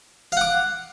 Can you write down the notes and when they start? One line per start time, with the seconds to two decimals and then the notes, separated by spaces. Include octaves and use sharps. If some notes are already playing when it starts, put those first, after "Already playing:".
0.32 F5
0.37 F#5
0.41 D6